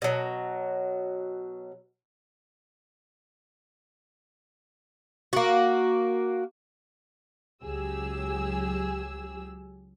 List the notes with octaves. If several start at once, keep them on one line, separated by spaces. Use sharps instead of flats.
B2 F#3
A#3 F#4
C#2 F#3 G4 G#4 E6